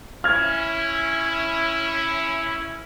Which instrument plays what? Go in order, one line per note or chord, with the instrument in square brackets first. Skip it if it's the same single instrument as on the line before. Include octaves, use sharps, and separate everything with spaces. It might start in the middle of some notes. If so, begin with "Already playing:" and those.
[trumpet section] C#4 E4 [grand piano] F6 G#6